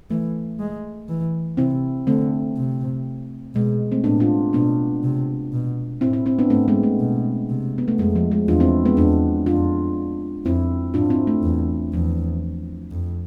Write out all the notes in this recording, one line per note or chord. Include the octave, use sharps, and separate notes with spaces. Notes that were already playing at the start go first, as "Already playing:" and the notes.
E3 A3
G#3
E3
C3 C4 E4
D3 A3 C4
C3
B2 G#3
A3 C4
A2 B3 D4
D4 F4
B2 B3 D4
C3
B2
A2 C4 E4
C4 E4
C4 E4
B3 D4
G#2 A3 C4
G#3 B3
A3
B2
C3
B3
A3
F2 G#3
F3
G#3
E2 D4 F4
C4 E4
G#3 B3
E2 B3 D4
F2 D4 F4
F2 C4 E4
G#2 D4 F4
C4 E4
A3
E2
E2 F3
F2